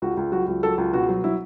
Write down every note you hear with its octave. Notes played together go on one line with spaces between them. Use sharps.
C#2 F#4
C#2
F#3 F#4
C#2
F#3 A4
C#2
B2 F#4
F#3
F#3 E4